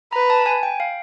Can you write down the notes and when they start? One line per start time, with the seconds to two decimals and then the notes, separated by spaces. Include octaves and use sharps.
0.13 B4 A#5
0.30 A5
0.46 G#5
0.63 G5
0.80 F5